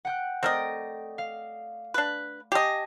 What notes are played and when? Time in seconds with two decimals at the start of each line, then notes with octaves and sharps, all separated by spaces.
0.05 F#5 G5 F#6
0.43 A3 C4 A#4 D5 D#5 G5
1.18 F5
1.94 D4 B4
2.52 G4 D#5 G#5 A5 C7